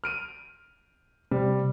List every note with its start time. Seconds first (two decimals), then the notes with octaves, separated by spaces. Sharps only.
0.04 F6 D7 D#7
1.31 C3 G3